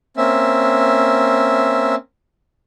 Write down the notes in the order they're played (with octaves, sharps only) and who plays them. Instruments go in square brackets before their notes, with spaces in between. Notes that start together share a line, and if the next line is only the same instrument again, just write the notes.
[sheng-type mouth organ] A#3 C4 C#4 E5